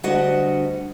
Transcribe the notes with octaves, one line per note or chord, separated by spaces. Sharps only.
D2 G3 D4 F#4 D#5 F#5